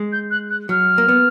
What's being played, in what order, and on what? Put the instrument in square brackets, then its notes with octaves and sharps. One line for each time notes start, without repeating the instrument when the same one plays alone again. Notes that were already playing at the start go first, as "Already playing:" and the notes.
Already playing: [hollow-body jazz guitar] G#3
[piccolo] G6
F#6
F#6
[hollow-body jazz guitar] F#3 [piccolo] F6
[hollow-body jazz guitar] A#3
B3